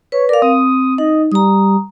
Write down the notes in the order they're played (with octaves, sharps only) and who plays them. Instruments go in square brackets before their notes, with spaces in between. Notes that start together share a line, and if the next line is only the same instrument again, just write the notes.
[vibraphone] B4 [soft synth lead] C#5
[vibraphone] A#4 F5 [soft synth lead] D5
[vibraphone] C4 [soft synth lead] D#6
[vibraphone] D#4 [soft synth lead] D#5
[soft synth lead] G3 [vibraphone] A#5 D#6